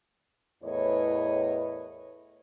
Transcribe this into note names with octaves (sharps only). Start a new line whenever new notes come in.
E2 A2 A#4 B4 C#5 D#5